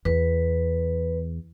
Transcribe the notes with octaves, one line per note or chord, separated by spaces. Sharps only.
E2 B4